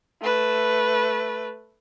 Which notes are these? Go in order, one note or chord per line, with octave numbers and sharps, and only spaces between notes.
A3 B4